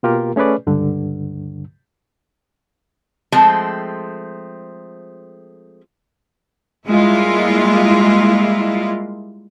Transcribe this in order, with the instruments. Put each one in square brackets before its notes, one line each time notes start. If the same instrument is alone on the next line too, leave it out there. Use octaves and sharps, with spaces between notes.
[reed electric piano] B2 A#3 F4 G4 A#4
A3 C#4 G#4 B4 D5
C#2 G2 D3
[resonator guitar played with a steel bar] F3 G#3 A3 C4
[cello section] G3 G#3 A#3 E4 F4